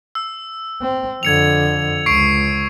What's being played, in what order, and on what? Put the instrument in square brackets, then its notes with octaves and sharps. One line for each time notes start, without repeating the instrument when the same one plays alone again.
[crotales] E6
[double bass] C4
[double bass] F2 D3 [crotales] G#6 C#7 F7
[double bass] C#2 [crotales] C#6 C7 D7